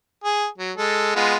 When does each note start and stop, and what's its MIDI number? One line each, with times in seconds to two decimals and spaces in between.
0.24 0.46 68
0.58 0.72 54
0.77 1.13 56
0.77 1.13 69
1.16 1.37 56
1.16 1.37 59
1.16 1.37 65